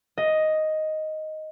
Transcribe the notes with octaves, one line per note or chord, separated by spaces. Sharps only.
D#5